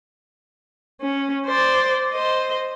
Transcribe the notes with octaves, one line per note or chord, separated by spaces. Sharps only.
C#4
C5 D5
C5 D#5